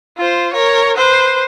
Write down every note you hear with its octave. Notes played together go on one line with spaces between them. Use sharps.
F4 C5
A#4 C#5
B4 C5